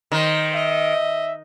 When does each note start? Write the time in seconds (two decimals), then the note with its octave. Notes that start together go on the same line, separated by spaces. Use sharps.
0.12 D#3 C5 D#5
0.54 D#5 E5